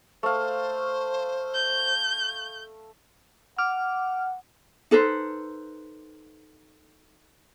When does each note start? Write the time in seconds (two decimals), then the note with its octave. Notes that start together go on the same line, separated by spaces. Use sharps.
0.23 A3 C5 F5
1.54 G6
3.58 F#5 D6 F6
4.91 D#4 A4 B4 C5